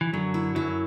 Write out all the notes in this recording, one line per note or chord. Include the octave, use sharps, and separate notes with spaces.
E3
F#2 D3 F#3
E4
F#2 F#3 E4